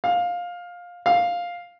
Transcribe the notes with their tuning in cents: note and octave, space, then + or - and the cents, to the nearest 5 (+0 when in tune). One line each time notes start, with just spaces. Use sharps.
F5 +15
F5 +5